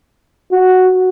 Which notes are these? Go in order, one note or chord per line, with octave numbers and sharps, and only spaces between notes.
F#4